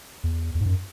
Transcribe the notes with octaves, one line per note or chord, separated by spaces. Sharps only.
E2
E2
G#2
F#2